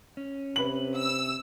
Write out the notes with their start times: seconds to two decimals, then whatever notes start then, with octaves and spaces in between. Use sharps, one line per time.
0.17 C#4
0.56 C3 B4 F#7
0.98 E6